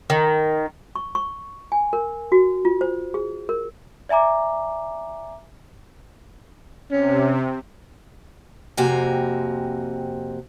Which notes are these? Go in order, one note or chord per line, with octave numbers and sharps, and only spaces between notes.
D#3
C#6
C#6
G#5
A#4
F#4
F4
C5
G#4
A#4
D5 E5 G#5 A#5 D6
C3 C#4
F2 C3 A#3 F#4 G5 G#5